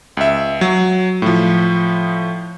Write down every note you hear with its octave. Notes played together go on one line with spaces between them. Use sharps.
C#2 E5
F#3
A2 F3